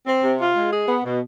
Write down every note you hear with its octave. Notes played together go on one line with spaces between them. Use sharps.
C4
C3
F4
G#3
G#4
B3
B2